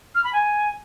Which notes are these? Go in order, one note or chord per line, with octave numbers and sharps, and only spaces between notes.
F6
B5
G#5